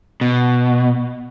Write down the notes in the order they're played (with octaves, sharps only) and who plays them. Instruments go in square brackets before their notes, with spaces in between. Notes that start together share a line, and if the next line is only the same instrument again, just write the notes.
[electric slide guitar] B2